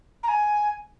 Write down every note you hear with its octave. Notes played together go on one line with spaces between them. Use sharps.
A#5
G#5